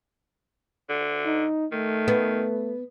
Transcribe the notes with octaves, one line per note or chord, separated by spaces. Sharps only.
D3
D#4
D#3 A3
B3